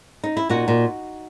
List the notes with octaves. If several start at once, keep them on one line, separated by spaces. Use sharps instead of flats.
D#4
E4
A#2 D#4 F#4
A#2